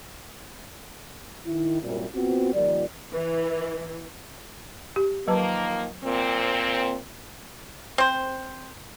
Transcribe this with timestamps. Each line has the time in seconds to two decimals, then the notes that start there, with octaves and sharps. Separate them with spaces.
1.46 D#3 E4
1.82 C2 F#2 A#2
2.15 B3 C4 F4 F#4
2.54 A#2 D#3 F3 G3 F4 D5
3.12 E3
4.96 G4
5.28 D#3 F3 F#3 A#3 B4 A5
6.04 A#2 C4
7.98 C4 C5